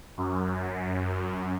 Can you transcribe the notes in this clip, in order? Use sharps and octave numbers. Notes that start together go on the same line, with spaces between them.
F#2